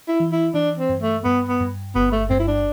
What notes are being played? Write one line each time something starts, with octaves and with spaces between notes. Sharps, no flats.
E4
E3
E4
E3 D4
C4
G2
A3
G2 B3
B3
G2
G1 B3
A3
G2 C4
E4
D4